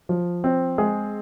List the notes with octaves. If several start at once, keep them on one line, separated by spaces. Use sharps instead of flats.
F3
C4
G#3 G#4